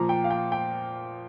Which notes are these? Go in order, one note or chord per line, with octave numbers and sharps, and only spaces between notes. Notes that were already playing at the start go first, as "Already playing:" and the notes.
Already playing: A#2 F3 A#5
G5
F5
G5
G5